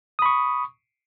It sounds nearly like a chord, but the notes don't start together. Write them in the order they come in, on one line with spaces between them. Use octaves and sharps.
D#6 B5 C#6